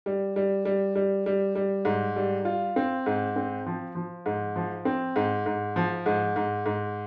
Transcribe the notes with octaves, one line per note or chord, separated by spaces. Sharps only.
G3
G3
G3
G3
G3
G3
G#2
G3
F4
C4
G#2
C4
F3
F3
G#2
F3
C4
G#2
G#2
F3
G#2
G#2
G#2